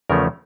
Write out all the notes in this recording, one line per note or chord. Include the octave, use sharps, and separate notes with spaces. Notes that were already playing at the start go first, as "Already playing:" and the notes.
E2 C#3 F3 A3 C#4 A#4